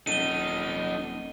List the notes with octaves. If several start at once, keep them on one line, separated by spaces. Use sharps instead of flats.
D#1 D#4 A4 D#7 G7